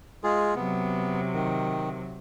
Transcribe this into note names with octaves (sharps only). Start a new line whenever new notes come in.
G#3 F4 G#4
C3 F#3 B3
D#3